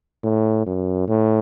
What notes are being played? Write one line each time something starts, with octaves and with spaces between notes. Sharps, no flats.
A2
F#2
A2